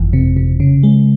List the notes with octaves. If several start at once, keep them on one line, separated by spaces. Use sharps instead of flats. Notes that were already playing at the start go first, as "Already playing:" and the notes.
Already playing: G1 F2 E3
C3
C3
C#3
G#3